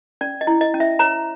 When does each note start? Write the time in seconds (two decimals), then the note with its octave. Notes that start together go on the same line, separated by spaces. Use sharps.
0.21 C#4 D5
0.41 D#5
0.47 E4
0.61 D#5
0.74 C#4
0.80 E5
0.99 C#5 A#5